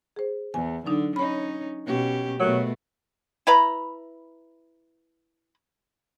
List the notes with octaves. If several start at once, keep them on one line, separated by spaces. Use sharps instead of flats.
G#4 C5
E2 G#5
D3 F#3 D4 D#4
C#4 D#4 C#5 B5
B2 C#4 G4
B2 F#3 A3 A#4
E4 B4 A#5 B5